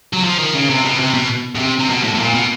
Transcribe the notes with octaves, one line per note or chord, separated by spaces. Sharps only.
F#3
F3
D#3
C#3
C3
B2
C3
B2
B2
C3
C3
B2
A2
A2
A#2
B2